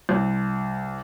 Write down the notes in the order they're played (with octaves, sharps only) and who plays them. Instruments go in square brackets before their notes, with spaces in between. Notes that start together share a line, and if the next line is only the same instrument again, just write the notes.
[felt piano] C2